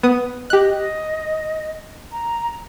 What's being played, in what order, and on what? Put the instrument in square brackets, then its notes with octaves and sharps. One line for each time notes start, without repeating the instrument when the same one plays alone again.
[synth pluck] B3 D#6
[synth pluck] G4 F#6 [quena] D#5
[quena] A#5